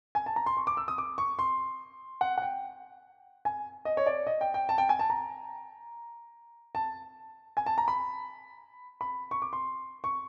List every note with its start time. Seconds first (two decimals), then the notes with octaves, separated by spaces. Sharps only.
0.15 G#5
0.26 A5
0.36 A#5
0.46 C6
0.57 C#6
0.67 D6
0.77 E6
0.88 D#6
0.98 D6
1.18 C#6
1.39 C6
2.21 F#5
2.38 F#5
2.42 G5
3.45 G#5
3.85 D#5
3.97 C#5
4.07 D5
4.27 D#5
4.41 G5
4.54 G5
4.69 A5
4.78 G5
4.89 G#5
4.99 A5
5.10 A#5
6.75 A5
7.57 G#5
7.66 A5
7.78 A#5
7.88 B5
9.01 B5
9.31 C#6
9.42 D6
9.53 C6
10.04 C#6